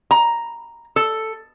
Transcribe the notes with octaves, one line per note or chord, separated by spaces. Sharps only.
A#5
A4